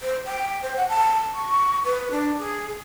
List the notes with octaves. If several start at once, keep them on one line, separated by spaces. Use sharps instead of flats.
C5
G5
C5
F#5
A5
C#6
B4
D4
G#4